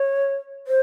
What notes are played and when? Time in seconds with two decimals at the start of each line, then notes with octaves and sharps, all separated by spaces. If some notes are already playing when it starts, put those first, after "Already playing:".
Already playing: C#5
0.67 C5